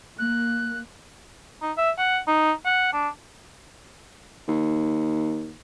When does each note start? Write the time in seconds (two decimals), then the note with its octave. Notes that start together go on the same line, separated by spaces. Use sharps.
0.19 A#3 F#6
1.62 D#4
1.77 E5
1.99 F#5
2.27 D#4
2.66 F#5
2.93 D4
4.48 D#2